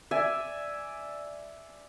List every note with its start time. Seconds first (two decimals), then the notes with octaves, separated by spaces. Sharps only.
0.11 D5 E5 G#5